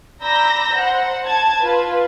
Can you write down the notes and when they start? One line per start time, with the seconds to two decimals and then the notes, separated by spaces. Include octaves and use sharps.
0.22 D5 A#5 B5 E6 G6 A#6
0.74 C5 F#5
1.25 A5 G#6
1.61 F4 B4